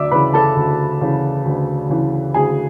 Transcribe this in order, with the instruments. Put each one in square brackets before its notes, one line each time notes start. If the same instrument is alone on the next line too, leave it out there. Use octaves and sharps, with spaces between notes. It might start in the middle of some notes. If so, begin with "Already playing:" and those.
Already playing: [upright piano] D2 D5 E5 D6 E6
C#3 E3 B4 B5
A4 A5
D2
C#3 E3
D2
C#3 E3
D2 G#4 G#5